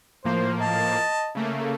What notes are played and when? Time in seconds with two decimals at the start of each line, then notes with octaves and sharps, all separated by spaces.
0.25 A2 F3 A#3 C5
0.61 D#5 A5
1.35 C#3 A3 A#3